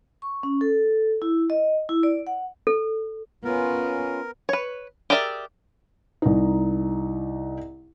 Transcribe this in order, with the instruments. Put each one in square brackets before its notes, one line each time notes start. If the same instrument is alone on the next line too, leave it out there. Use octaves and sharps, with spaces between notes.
[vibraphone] C#6
C#4
A4
E4
D#5
E4
D5
F#5
[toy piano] A4
[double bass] B3 [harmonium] C#4 F4 [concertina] A#4
[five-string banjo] B4 C#5
G4 G#4 A#4 D5 E5
[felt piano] C2 D#4